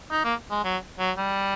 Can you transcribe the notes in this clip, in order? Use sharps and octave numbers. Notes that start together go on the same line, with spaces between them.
D#4
A#3
G#3
F#3
F#3
G3